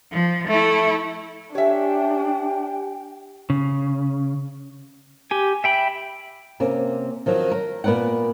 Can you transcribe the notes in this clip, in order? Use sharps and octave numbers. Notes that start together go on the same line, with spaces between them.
F3
A3 E4
D4 G4 C#5 E5 G5 G#5
C#3
G4 G#5
E5 G5 B5
C3 A#3 C#4
D#3 F3 F#3
A#4
A#2 B3 A#4 D5 F#5